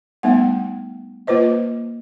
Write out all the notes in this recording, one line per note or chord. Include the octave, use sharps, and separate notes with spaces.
G3 A3 B3 D#4 F#5
A#3 F4 B4 C5 D#5